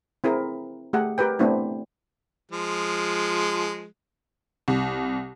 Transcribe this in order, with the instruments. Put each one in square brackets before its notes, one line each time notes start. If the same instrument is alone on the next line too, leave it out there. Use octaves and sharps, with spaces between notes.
[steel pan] C4 E4 G#4 A#4
A3 G4 G#4 F#5
G4 A#4 B4 G5
A3 B3 C4 D4 E4
[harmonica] F3 G#3
[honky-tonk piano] C2